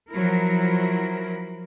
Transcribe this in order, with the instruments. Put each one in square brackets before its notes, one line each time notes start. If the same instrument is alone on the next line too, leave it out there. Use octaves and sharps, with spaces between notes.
[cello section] F3 F#3 E4 A#4